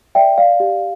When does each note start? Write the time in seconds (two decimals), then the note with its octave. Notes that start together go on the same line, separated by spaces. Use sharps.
0.15 D5 E5 G5
0.38 D5 F5
0.60 G4